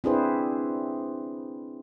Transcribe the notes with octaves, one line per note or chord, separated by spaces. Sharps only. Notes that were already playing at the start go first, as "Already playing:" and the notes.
C4 D4 E4 G#4 B4 C5